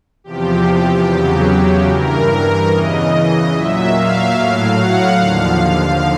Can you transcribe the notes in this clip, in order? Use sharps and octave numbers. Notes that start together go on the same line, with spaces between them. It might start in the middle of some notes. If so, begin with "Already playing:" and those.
E2 C3 F3 G4
E2 C#3 F#3
G2 E3 A#4
E2 C#3 E3 D#5
A#2 F#3 E5
F5
A2 F#3 F5
F#5
D#2 D3 F3 F5